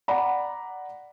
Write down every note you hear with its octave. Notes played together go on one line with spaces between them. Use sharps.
D5 F#5 A#5 B5